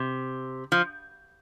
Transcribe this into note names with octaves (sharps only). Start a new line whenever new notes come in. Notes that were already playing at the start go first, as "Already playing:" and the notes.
Already playing: C3
F3